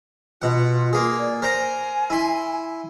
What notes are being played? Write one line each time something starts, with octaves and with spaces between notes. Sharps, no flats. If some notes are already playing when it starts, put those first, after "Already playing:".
B2 F4 F#5
A#3 G#4
D5
A#4 C5 G#5 A#5
E4 C6